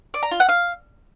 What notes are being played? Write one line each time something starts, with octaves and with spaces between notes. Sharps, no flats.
D5
A#5
F4
F#5
F5